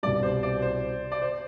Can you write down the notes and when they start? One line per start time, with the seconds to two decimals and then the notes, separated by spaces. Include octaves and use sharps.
0.03 G3 D5
0.06 C2 B2
0.23 C5
0.43 D5
0.62 C5
1.12 D5
1.22 C5